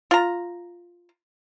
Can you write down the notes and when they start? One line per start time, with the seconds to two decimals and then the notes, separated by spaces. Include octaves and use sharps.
0.11 F4 A#5